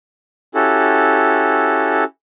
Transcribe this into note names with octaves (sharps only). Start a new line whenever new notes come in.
C#4 E4 F#4 G4 A4